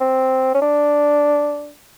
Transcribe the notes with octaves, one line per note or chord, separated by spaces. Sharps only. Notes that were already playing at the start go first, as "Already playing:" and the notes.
C4
C#4
D4